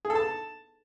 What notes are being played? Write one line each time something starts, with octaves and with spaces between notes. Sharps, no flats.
G#4
A4
A5